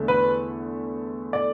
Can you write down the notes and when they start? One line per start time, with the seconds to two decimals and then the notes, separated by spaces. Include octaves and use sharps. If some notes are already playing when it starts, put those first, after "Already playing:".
Already playing: E2 D3 A3
0.08 B4
1.33 D5